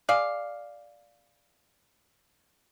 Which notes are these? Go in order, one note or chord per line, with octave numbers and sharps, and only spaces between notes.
G#4 D5 F5